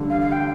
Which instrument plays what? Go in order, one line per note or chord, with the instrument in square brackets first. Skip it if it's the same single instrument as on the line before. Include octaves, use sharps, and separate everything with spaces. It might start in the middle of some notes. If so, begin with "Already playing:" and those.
Already playing: [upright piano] A1 G2 D3
[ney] F5
F5
G5